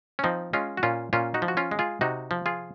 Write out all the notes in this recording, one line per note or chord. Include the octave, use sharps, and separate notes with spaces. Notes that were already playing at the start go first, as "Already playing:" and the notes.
C#4
F3 C4 D#4
G#3 C#4 F4
F#4
A#2 C#4 F4
A#2 C#4 F4
D#4 F#4
F3
F#4
C#4 F4
G#3
F4 G#4
C3 D#4 F#4
F3
F4 G#4